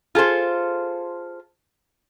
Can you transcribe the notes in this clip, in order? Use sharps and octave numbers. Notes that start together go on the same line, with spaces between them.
F4 G#4 A4 C5